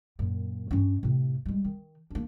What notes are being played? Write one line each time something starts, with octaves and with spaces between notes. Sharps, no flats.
F#2 A#2
G2 C#4
A2 C3
G3 G#3
D#3
A#3 D4